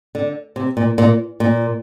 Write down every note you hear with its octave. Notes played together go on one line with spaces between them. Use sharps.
D3
C3
A#2
A#2
A#2